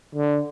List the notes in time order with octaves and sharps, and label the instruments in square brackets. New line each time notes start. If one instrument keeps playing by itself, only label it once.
[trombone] D3